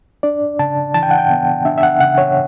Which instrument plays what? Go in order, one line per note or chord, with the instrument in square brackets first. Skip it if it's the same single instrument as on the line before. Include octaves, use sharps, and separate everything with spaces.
[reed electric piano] D4 D5
C#3 A5
E3 A5
G5
F#5
G5
B3
D4 E5
E5
F#5
C#3 F#5
C#5